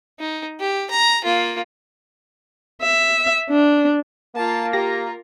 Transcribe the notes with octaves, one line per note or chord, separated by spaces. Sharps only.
D#4
G4
A#5
A#3 F4
E5
D4
A#3 F4 A5
F4 G4 A#4 A#6